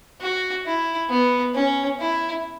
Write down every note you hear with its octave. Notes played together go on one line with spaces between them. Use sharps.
F#4
E4
B3
C#4
E4